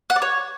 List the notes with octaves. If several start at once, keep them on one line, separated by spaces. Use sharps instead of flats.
F#5
D5
C#5